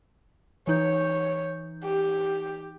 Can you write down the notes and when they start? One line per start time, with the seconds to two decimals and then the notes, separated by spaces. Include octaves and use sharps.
0.67 E3 D#4 C#5 G6
1.84 G4